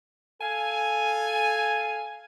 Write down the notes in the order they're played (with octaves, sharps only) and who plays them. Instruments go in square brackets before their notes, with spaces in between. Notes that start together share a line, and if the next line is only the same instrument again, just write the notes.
[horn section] A4 F5 G#5